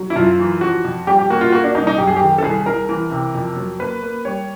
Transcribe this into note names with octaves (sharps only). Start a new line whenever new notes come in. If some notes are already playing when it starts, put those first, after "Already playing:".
Already playing: F#3
E4
F#2 F4
E3
F3 F#4
F2
G3 G4
G4
A#3 F#4
F4
A#3 F#4
D4
C2 D#4
D#4
F#2 G4
G#4
D#3 G4
A4
C2 G#4
C2 A#4
E3
C3
F2
F#3
A#3 B4
A#3
G3 C#5